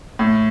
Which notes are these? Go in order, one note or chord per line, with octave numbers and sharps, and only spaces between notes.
A2